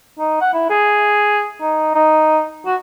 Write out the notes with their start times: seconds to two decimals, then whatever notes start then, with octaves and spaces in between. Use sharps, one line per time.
0.19 D#4
0.41 F#5
0.53 E4
0.70 G#4
1.61 D#4
1.95 D#4
2.66 F#4